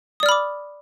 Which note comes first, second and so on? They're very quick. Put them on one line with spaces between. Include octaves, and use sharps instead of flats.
D#6 D5 F6 B5 D6